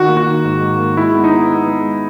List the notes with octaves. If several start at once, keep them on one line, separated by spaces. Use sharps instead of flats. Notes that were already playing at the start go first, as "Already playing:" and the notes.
Already playing: D#3 F#4
A#3
F#4
D#3
G#2
G#2
A#3
G#3 E4
B3
D#4
B3
B3
G#3